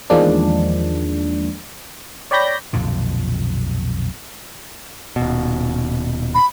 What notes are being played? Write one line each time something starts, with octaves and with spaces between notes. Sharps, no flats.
E2 D#3 F3 G#3 A#3 D4
C#5 D5 G5 B5 G6 A#6
B1 F2 A#2 D3
D#1 B2
B5